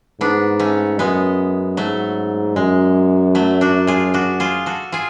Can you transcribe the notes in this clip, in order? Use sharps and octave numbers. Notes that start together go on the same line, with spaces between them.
G#2 B3 D4
A3 C#4
F#2 G#3 B3
G#2 F#3 A3
F#2 G#3
F#3 A3
D4 F#4
F4 G#4
D4 F#4
F4 G#4
F#4 A4
F4 G#4